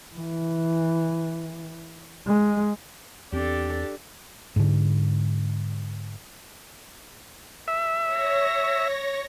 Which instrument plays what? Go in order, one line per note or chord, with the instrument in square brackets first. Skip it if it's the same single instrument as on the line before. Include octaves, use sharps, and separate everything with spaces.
[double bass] E3
G#3
[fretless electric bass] E2 C4 [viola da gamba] D4 A4 [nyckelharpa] G4
[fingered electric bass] G#2 D3
[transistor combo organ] E5
[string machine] C#5 A#6